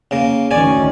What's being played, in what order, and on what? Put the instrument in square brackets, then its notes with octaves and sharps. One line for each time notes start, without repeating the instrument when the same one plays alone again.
[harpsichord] C#3 A#3
[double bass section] D2 D#3 C#4 [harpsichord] D5 G#5